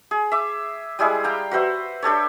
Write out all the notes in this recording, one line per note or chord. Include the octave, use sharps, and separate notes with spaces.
G#4
E5 D6
G3 G#3 E4 G#4
F5 G5 A#5
F#4 B4 C5 E5
D4 G4 A4 C#5